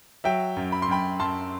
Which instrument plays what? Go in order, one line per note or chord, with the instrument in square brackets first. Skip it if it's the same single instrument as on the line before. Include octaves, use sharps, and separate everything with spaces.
[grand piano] F#3 E5 G5
F#2
B5
C6
F#2 G5 B5
F#2 A5 C6